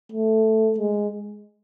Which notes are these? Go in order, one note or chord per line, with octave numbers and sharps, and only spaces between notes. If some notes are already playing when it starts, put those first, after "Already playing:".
A3
G#3